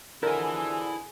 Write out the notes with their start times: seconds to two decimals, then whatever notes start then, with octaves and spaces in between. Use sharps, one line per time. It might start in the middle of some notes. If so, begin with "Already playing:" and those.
0.23 F2 B2 D3 E4 G#4 A#4 G#5